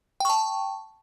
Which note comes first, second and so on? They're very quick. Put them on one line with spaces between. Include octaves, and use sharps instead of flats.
G5 C#6 A5